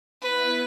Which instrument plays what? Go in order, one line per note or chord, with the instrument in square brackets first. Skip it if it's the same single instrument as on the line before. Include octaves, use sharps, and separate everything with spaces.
[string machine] B3 E4 [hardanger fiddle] B4